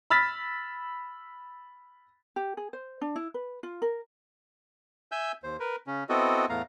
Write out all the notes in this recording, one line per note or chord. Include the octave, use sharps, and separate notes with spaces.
B5 E6 F6 A6 B6
G4
G#4
C5
D4
E4
B4
F4
A#4
E5 G#5 E6 G6
D#2 C5
A#4 B4
C#3 C#4
B3 C4 E4 F#4 A4 D#5
E2 A2 A3 B3 F5 A#5